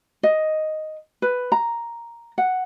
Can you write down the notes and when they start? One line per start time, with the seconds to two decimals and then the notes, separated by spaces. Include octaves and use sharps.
0.23 D#5
1.22 B4
1.52 A#5
2.38 F#5